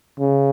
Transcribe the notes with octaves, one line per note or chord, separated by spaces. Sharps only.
C#3